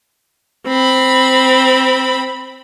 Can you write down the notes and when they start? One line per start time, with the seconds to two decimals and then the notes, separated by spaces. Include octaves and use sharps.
0.67 C4 B5